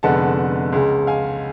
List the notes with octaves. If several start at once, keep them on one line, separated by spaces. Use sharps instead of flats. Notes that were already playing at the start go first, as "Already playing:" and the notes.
F1 F2 D3 G#3 B3 F#5 A5
C#2 C#3 G#3
F5 G#5